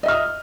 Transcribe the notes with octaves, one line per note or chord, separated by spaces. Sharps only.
D#5 E5 D#6 F6